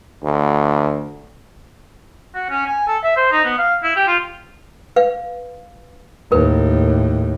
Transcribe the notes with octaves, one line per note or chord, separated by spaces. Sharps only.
D2
F#4
C#4
G#5
A4
E5
C5
D#4
B3
F5
E4
G4
F4
B4 F5
D#2 A2 A#4 B4